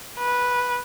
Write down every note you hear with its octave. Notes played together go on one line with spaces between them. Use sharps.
B4